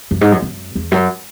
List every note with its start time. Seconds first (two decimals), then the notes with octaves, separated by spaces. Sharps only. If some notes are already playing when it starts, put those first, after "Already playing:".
0.11 F#2
0.21 G#2
0.32 F#2
0.42 F#2
0.75 E2
0.91 F#2